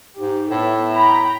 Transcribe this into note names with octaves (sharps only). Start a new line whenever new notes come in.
G#2 G4
A2 B3 A4 E5
G5 A#5 B5